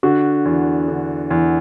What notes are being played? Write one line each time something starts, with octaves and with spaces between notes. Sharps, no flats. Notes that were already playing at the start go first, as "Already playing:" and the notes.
D3 F#4
E2
D3
E2